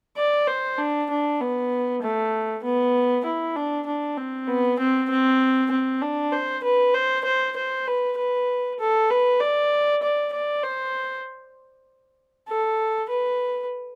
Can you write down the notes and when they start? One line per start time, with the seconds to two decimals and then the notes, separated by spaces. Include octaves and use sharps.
0.17 D5
0.48 C5
0.78 D4
1.10 D4
1.41 B3
2.03 A3
2.64 B3
3.25 E4
3.56 D4
3.87 D4
4.17 C4
4.48 B3
4.79 C4
5.10 C4
5.71 C4
6.02 D4
6.32 C5
6.64 B4
6.94 C5
7.25 C5
7.57 C5
7.87 B4
8.18 B4
8.79 A4
9.10 B4
9.40 D5
10.03 D5
10.33 D5
10.63 C5
12.48 A4
13.10 B4